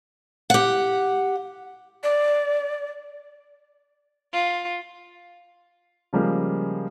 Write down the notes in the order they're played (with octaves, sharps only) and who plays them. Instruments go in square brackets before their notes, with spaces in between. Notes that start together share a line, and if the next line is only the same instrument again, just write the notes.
[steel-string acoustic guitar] G4 F#5
[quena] D5
[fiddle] F4
[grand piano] C#3 F3 G3 G#3 A#3